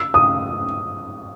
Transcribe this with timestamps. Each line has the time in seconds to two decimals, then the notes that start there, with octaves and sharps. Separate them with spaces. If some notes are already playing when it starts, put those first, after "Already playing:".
Already playing: E6
0.14 D#6